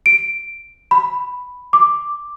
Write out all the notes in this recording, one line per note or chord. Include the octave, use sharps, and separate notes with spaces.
D7
B5
D6